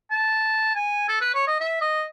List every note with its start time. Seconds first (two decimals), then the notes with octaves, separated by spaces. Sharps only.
0.11 A5
0.75 G#5
1.08 A4
1.21 B4
1.35 C#5
1.47 D#5
1.60 E5
1.81 D#5